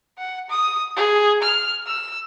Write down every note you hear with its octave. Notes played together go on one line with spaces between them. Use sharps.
F#5
D#6
G#4
F6
E6